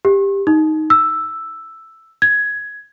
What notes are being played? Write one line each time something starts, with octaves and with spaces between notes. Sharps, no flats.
G4
D#4
E6
G#6